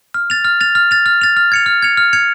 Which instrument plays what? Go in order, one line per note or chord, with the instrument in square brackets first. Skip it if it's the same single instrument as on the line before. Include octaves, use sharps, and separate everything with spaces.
[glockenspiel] F6
A6 F7
F6
A6 F7
F6
A6 F7
F6
A6 F7
F6
G#6 C#7 F7
F6
G#6 C#7 F7
F6
G#6 C#7 F7